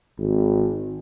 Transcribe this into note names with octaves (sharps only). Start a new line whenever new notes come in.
G#1